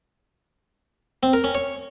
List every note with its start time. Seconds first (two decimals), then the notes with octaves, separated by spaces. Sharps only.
1.23 C4
1.33 A#4
1.44 C#4
1.55 C#5